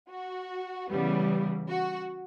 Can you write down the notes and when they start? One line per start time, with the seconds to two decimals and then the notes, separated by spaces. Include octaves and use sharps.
0.10 F#4
0.90 C#3 E3 G3 B3
1.70 F#4